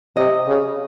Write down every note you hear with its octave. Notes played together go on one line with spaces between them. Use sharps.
C3 D#5
C#3